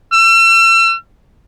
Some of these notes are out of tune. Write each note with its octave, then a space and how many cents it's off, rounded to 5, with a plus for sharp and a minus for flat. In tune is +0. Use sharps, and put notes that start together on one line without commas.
E6 +40